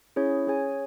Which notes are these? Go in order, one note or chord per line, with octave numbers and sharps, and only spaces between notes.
C#4 E4 G#4 C#5
C#4 G#4 C#5 G#5